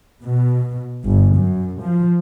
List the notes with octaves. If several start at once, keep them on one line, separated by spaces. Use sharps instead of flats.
B2
G1
F#2
F3